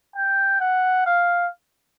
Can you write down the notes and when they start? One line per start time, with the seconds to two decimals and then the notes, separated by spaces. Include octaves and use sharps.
0.16 G5
0.61 F#5
1.06 F5